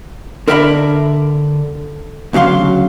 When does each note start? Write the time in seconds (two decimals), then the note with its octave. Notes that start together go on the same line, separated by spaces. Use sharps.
0.48 D3 A#4 D5 E5 A5 B5
2.33 D2 C#3 F#3 F5 C6